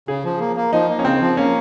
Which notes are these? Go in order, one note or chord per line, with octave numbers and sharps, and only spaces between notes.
C#3 G#4
F3
A#3
A#3
F3 D#4
A#3
C#4
C#3 C4
F3
A#3 C#4